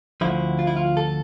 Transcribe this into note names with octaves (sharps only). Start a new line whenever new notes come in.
D2 D3 F3 E4
F4
E4
F4
A4